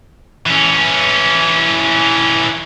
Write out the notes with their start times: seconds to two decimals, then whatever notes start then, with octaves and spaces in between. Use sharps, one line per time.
0.46 E3 C#4